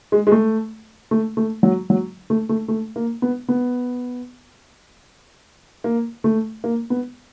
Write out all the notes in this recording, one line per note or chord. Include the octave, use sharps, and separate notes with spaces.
G#3
G#3
A3
A3
A3
F#3
F#3
A3
A3
A3
A#3
B3
B3
A#3
A3
A#3
B3